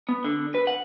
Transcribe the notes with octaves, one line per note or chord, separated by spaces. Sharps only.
B3
D3
B4
F#5